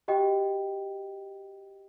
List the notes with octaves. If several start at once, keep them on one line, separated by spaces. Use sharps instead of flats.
F#4 G4 D#5 G5